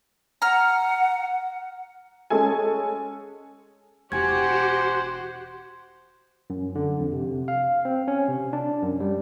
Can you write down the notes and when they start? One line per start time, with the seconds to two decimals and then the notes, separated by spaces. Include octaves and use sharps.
0.42 F#5 A#5 F6
2.30 G#3 C#4 G#4 A4 G#5
4.12 E1 E4 F#4 G4 C5 F#5 G#5 G#6
6.50 F#2
6.75 D3
7.00 F2
7.12 C3
7.48 F5
7.85 C4
8.08 C#4
8.28 C3
8.53 D4
8.82 F#2
9.00 G3